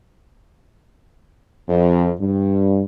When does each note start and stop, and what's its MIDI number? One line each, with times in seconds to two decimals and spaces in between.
1.68 2.09 41
2.20 2.84 43